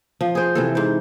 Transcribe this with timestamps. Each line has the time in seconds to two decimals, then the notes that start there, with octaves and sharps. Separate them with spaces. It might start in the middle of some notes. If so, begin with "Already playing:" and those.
0.21 F3
0.35 G#4 C5
0.55 C3 E3 A4
0.75 G#2 C5